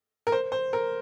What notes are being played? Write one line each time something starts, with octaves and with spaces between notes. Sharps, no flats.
A#4
C5
C5
A#4